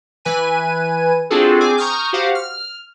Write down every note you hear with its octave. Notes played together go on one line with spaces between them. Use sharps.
E3 B4 G#5 D#7
C4 D4 F4 F#4 G#4 A4
C4 G#4 G#5 D6
A#5 C#6 D#6 F6 G6
F#4 G4 C5 F5 F#5
F6